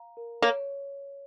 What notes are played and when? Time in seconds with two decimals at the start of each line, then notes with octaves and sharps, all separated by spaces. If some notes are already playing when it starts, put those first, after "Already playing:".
Already playing: F5 A#5
0.17 A#4
0.42 A#3 C#5